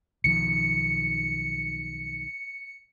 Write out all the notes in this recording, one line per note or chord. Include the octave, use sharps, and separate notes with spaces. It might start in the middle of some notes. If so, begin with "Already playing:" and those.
B1 D#3 F3 C#7